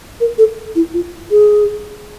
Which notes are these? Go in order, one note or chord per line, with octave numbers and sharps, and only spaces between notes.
A#4
A4
E4
F4
G#4